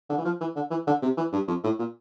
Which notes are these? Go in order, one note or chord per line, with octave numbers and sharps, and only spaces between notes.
D3
E3
F3
E3
D3
E3
D3
C3
E3
G2
F2
A2
A#2